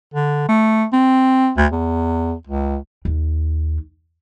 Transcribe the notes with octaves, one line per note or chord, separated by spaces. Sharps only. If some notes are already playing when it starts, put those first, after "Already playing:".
D3
A3
C4
D2
E2
C#2
D#2